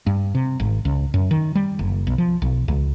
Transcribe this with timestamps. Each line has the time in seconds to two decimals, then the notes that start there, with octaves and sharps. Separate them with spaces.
0.07 G2
0.35 C3
0.60 G#1
0.85 C#2
1.14 F#2
1.31 D#3
1.55 G3
1.79 F#1
2.07 B1
2.18 F3
2.42 B1
2.68 C#2